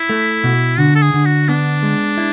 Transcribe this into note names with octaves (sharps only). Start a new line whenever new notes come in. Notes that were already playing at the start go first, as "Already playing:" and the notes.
Already playing: E4
A3
B2
D3 F#4
A4
G#4
D3
F#4
B3 D4
G#3
E4